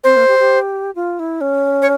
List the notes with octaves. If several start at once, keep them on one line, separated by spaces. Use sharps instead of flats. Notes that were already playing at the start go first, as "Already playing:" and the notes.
C4 C5
A#3
G4
G4
F4
E4
C#4
C#5